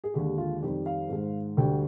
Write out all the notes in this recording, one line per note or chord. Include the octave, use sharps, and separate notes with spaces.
G#4
D#2 D3 G#3 G4
F4
F2 D#3 G3 G4
F5
G#2 D#3 G#3
D2 D3 G3 G5